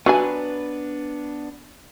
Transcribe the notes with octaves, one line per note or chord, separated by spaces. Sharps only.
F#3 B3 D4 B4 G#5